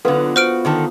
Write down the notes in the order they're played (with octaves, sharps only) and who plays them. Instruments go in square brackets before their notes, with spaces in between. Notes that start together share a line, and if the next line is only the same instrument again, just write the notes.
[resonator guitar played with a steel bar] D3 F#3 [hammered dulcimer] B3 F4 [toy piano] A4 B4 F5
[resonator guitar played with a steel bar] F#4 [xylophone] C5 F6 D7
[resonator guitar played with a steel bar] D3 D#3 A4